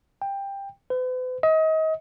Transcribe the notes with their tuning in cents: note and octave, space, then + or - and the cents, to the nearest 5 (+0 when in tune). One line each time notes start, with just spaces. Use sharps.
G5 +15
B4 +45
D#5 +30